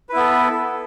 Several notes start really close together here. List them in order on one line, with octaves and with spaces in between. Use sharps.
B4 E4 B3 A4